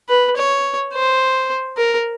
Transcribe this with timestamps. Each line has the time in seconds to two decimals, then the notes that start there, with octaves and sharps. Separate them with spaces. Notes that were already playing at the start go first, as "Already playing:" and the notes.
0.09 B4
0.36 C#5
0.94 C5
1.77 A#4